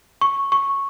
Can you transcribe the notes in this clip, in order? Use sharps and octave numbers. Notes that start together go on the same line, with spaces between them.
C#6
C#6